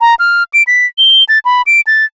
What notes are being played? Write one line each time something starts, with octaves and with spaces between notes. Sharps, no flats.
A#5
F6
D7
B6
G7
A6
B5
D7
A6